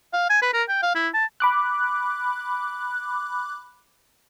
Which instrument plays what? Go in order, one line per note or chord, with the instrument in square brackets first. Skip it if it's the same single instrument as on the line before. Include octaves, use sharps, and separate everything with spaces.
[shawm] F5
G#5
B4
A#4
G5
F5
E4
A5
[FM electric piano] B5 D6 F#6